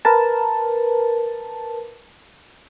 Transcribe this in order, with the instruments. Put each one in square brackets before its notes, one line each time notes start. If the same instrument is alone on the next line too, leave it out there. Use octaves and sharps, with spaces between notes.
[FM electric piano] A#4 B4 A5